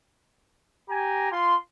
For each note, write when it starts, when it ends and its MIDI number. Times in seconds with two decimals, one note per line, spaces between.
0.89 1.28 67
0.89 1.28 80
0.89 1.28 82
1.32 1.55 65
1.32 1.55 84